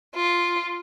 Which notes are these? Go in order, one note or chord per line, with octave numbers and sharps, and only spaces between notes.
F4